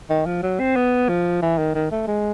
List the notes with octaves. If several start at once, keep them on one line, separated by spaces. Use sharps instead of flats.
D#3
F3
F#3
C4
B3
F3
E3
D#3
D#3
A3
G#3